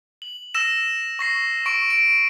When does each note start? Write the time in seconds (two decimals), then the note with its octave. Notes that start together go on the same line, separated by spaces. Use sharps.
0.22 F#7
0.54 E6 A#6 E7
1.19 C#6 A#6 C7
1.66 C#6 D7
1.90 D7